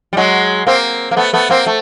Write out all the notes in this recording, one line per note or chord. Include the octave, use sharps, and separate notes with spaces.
G3
F#3 G#3
A#3 C4
A#3
A3 B3
A3 B3
A#3 C4
A3